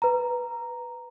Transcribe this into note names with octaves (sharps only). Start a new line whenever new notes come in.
B4 A#5